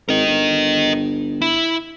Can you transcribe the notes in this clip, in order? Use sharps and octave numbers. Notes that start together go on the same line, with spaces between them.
G#1 A#4 D#5
G1
E4